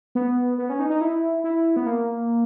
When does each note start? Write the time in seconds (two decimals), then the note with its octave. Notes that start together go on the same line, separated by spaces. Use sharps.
0.15 B3
0.58 B3
0.70 C#4
0.80 D#4
0.90 D#4
1.01 E4
1.44 E4
1.76 B3
1.87 A#3